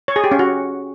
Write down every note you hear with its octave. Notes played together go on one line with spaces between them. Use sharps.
C#5
G#4
G4
C#4
F#4